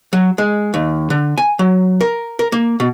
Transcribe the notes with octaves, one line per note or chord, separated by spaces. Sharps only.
F#3
G#3
D#2
D3
G#5
F#3
A#4
A#4
A#3
B2